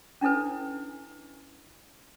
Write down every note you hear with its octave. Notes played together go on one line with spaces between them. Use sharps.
C#4 D4 E4 A4 B4